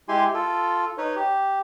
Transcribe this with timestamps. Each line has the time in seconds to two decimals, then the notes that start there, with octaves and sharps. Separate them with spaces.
0.09 G#3 E4 G4 G#5 C6
0.34 F4 A4
0.98 D#4 B4 C#5
1.15 G4